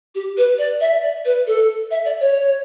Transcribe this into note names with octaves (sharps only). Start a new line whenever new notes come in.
G4
B4
D5
E5
D5
B4
A4
E5
D5
C#5